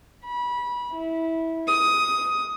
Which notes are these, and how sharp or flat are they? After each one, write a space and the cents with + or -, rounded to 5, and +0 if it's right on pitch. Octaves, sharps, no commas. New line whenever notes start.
B5 -25
E4 -15
D#6 +10